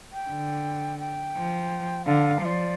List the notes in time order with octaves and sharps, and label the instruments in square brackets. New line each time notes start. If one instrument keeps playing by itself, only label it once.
[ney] G5
[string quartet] D3
[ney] G5
[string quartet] F3
[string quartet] D3 [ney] F5
[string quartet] F3 [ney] D5 F5